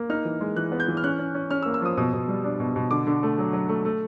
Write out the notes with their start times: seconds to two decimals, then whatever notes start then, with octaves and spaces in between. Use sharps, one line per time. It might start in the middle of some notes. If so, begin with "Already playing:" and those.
Already playing: A#3
0.10 D#4 F6
0.25 E3
0.41 G#3
0.56 E3 F#6
0.72 B3
0.80 G6
0.88 E3
0.97 F6
1.04 C#4 F#6
1.19 C#4
1.35 C#4
1.50 C#4 F6
1.62 E6
1.66 A#3
1.74 E6
1.82 F3 D#6
1.97 B2 D#6
2.13 B2
2.28 G3
2.44 D4
2.60 B2
2.76 B2
2.91 D3 D6
3.07 D3
3.23 A3
3.38 F#3
3.53 F#3
3.69 A3
3.85 A3